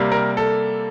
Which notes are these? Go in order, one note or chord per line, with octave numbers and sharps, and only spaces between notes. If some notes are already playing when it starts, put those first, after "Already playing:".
Already playing: C3 G3 A#3
A#4
A4